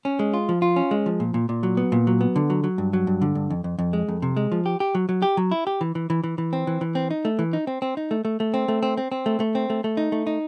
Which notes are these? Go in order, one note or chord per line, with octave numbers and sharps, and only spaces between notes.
C#4
G#3
F4
F3
F4
C#4
G#3
F3
A#2
A#2
A#2
F#3
B3
A#2
F#3
B3
D3
F#3
F#3
G2
F#3
G2
D3
G2
F2
F2
F2
G#3
F2
C3
G#3
F3
G4
G4
F#3
F#3
G4
F#3
E4
G4
E3
E3
E3
E3
E3
C4
E3
E3
C4
D#4
A3
E3
D#4
C4
C4
D#4
A3
A3
A3
C4
A3
C4
C4
C4
A3
A3
C4
A3
A3
D#4
A3
D#4